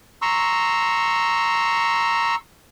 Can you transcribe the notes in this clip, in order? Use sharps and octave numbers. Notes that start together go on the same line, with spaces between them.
A#5 C6 C#6 E6